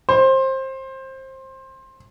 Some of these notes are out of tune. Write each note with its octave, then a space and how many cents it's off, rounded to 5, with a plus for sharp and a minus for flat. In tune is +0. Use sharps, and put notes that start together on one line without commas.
C5 +20